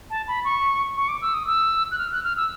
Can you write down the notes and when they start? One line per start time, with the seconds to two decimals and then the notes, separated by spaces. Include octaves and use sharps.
0.10 A5
0.28 B5
0.45 C#6
0.97 C#6
1.08 D6
1.22 E6
1.34 D#6
1.47 E6
1.91 F#6
1.98 F6
2.12 F#6
2.24 F6
2.37 E6